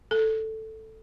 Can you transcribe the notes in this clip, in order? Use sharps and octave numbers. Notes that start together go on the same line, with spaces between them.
A4